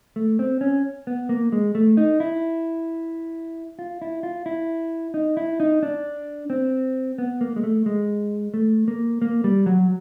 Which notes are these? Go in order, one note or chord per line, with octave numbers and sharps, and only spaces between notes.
A3
C4
C#4
B3
A#3
G#3
A3
D#4
E4
F4
E4
F4
E4
D#4
E4
D#4
D4
C4
B3
A#3
G#3
A3
G#3
A3
A#3
A#3
G3
F#3